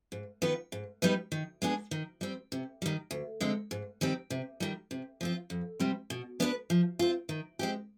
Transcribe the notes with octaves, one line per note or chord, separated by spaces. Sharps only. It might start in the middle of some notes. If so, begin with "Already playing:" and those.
G#2
D#3 B3 F4 B4
G#2
G3 B3 D#4 B4
D#3
G#3 B3 D4 G#4
D#3
G3 C4
C3
D#3 G3
D2
D3 G#3 C4
G#2
D#3 G3 C4
C3
D#3 G3
C3
F3 C4 F4
F2
C3 G3 C4
B2
B3 D4 G4 B4
F3
C4 F4
D#3
G#3 C4 G4